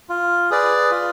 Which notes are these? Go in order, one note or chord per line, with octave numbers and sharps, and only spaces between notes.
F4
G#4 B4 D5
F4